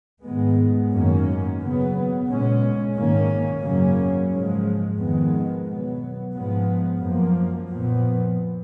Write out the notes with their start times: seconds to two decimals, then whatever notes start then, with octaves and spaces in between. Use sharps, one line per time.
0.26 G#2 D#3 G#3 B3
0.92 F#2 D#3 A#3 C#4
1.61 C#3 F#3 B3
2.28 A#2 G#3 C#4
2.96 G#2 D#3 A#3 C#4
3.63 F#2 C#3 F#3 A#3 C#4
4.30 G#2 F3 G#3
4.97 F2 D#3 G#3 B3
5.65 B2 F#3 B3
6.33 G#2 F3 G#3 B3
7.00 F#2 F3 A#3
7.68 A#2 F3 B3